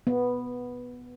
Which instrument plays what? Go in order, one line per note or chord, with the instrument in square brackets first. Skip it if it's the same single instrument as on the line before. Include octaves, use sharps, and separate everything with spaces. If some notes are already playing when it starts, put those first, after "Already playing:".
[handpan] B3